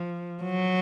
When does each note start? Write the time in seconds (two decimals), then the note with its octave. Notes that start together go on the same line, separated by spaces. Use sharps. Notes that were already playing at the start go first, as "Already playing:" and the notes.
Already playing: F3
0.43 F#3